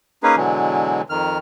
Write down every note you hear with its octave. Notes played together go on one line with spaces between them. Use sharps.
A#3 C#4 D#4 G#4 B4
B2 D3 E3 F#3 G#3
F2 D#3 F6